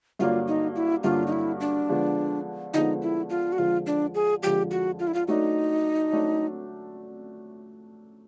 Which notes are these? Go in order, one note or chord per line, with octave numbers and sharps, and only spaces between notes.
G2 D3 F#3 A#3 D4 F4
D#4
E4
G2 D3 F#3 A#3 D4 F4
D#4
E4
D4
D3 F3 G#3 B3
D3 F3 G#3 B3 D#4
E4
F4
F#4
F2 D3 F3 G#3 F4
D4
G#4
F2 D3 F3 G#3 G4
F#4
F4
E4
F4
F#3 A3 D4 D#4
F#3 A3 D4